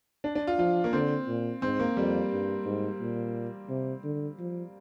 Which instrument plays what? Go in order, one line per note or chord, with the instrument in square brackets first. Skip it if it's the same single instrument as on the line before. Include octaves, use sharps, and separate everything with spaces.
[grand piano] D4
D4
F4
[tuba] F3 [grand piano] F4
[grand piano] A#3
[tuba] D3 [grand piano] C4
[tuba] A#2
[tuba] G#2 [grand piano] C4
[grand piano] A#3
[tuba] F2 [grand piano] G3
[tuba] G2
G#2
A#2
C3
D3
F3